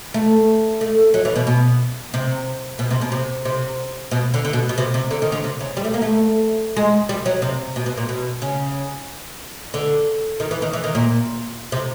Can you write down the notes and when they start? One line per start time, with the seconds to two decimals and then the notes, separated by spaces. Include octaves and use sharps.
0.14 A3
0.81 A3
1.14 F#3
1.25 E3
1.36 B2
1.47 B2
2.14 C3
2.79 B2
2.91 C3
3.01 B2
3.12 C3
3.45 C3
4.11 B2
4.34 D3
4.45 D3
4.53 B2
4.69 B2
4.78 C3
4.94 C3
5.11 D3
5.22 D#3
5.32 D3
5.44 C3
5.60 C#3
5.77 G3
5.85 A3
5.94 A#3
6.02 A3
6.76 G#3
7.09 G3
7.26 F#3
7.42 C3
7.76 B2
7.86 B2
7.97 A#2
8.09 B2
8.42 C#3
9.74 D3
10.40 D#3
10.51 E3
10.62 D#3
10.73 E3
10.84 D#3
10.95 A#2
11.72 C3